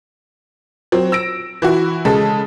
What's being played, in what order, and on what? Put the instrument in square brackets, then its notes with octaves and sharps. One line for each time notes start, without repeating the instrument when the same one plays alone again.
[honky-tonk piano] F#3 C4
E6 A#6 D7
E3 E4 F#4
C#3 G#3 A4